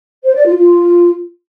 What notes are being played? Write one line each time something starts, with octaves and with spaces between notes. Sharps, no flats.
C5
D5
F4
F4